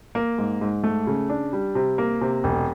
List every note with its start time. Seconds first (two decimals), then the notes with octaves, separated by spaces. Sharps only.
0.15 A#3
0.38 G#2
0.61 G#2
0.84 A3
1.07 C#3
1.29 D4
1.53 G3
1.75 C3
1.98 A#3
2.21 C3
2.44 E1